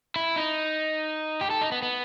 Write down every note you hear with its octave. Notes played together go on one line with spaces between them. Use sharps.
E4
D#4
G4
A4
D#4
B3
B3